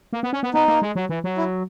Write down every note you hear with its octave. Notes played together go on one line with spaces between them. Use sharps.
A#3
B3
C#4
B3
B3 D#4
A#3
G#3
F#3
E3
F#3
E4